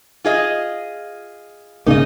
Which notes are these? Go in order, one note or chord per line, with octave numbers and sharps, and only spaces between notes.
F4 G#4 D#5
G#2 C#3 A#3 D#4 D#5